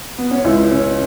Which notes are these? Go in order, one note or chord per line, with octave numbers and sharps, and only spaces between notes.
B3
C#4
C#2 E4
C#4